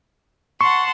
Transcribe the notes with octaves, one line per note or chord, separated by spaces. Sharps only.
F#5 A5 C6 C#6